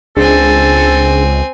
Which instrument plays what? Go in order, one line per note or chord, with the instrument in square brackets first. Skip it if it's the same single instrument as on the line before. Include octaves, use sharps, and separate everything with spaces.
[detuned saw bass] C#2 [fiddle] C4 G#5 [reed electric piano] D4 G#4 [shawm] A4